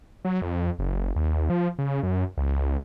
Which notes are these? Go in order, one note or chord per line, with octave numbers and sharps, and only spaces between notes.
F#3
F2
F#1
D#2
F3
C#3
F#2
C#2